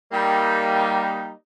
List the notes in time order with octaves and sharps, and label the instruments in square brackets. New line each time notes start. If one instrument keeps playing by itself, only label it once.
[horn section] G3 A#3 D#4